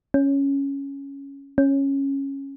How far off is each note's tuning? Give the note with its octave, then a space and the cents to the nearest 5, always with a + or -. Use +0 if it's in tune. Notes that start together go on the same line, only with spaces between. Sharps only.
C#4 +0
C#4 -10